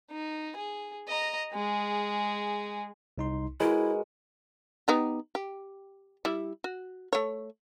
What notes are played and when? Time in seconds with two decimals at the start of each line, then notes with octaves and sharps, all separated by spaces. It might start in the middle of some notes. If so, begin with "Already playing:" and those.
0.11 D#4
0.57 G#4
1.08 D#5 A#5
1.54 G#3 G#4
3.18 C2 D#4 C6
3.60 G#3 E4 F#4 A#4 B4
4.88 B3 D#4 G4
5.35 G4
6.25 G3 E4
6.64 F#4
7.13 A3 C#5